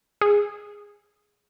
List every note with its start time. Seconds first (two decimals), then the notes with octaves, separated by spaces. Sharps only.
0.21 G#4